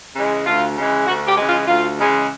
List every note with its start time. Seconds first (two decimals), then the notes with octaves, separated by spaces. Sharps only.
0.16 C#3 E3 G#3
0.46 D2 F4
0.77 C#3 E3 G#3
1.07 D2 F#4
1.27 G4
1.37 C#3 E3 G#3
1.46 F4
1.67 D2 F4
1.97 C#3 E3 G#3